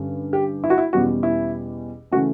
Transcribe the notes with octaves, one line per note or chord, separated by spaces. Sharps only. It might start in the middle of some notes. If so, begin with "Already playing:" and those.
Already playing: G2 D3 G3 C#4
G4
E4
F#4
E4
E2 B2 G3 C#4 F#4
E4
C#3 E3 A3 C#4 F#4